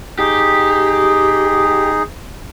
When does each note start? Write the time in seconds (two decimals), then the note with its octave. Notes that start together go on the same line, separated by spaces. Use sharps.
0.19 D#4 G4 G#4